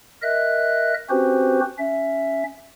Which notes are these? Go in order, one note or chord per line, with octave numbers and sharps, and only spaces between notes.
A#4 D#5 E5 F#6
C4 C#4 F#4 G4 B4 C5
C#4 E5